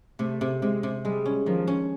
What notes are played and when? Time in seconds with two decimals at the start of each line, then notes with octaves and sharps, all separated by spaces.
0.19 C3 A3
0.41 C3
0.62 C3 G#3
0.83 C3
1.04 G3 G#3
1.25 C#4
1.46 D#3 F3
1.67 C#4